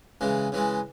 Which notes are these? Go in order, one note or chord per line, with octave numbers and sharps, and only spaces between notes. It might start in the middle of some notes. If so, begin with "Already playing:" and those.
C#3 E3 G#3
C#3 E3 G#3